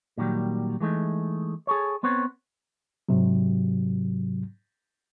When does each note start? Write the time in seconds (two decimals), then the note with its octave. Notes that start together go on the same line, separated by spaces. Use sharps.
0.18 A#2 D#3 F#3 G3
0.80 E3 G#3 A3 D#4
1.67 G#4 A4 C#5
2.03 B3 C4 B4 C#5
3.09 G#2 C3 F#3